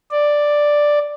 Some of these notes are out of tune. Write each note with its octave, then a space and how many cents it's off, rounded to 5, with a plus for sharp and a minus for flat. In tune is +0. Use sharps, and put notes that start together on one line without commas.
D5 +5